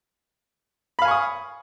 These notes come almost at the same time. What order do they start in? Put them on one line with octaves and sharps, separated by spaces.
B5 F5 G#5 C#6 D#6